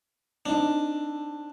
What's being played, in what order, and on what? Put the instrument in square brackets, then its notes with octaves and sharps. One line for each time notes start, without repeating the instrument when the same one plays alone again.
[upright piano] C4 D#4 [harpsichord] D4